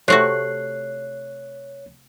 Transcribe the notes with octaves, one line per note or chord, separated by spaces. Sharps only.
C3 A3 F#4 C#5 F#6 C7